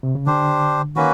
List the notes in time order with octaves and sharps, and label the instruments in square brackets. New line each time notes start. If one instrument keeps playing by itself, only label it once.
[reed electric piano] C3
C#3
[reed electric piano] D3 [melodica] D4 G4 C5
[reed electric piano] D#3 [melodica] A#3 C#4 F#4 B4